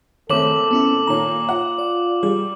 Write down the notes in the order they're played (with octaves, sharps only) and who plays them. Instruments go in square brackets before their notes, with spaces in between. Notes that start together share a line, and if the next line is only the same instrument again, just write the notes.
[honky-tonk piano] F#1 A3 C4 [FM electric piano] D#3 C#5 [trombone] A4 [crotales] D6 F#7
[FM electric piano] B3 C#4 E4
[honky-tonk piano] A#2 D#3 [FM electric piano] C#5 A#5
[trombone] F4 [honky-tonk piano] F#5
[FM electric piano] D5
[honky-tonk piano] G3 [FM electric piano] G#4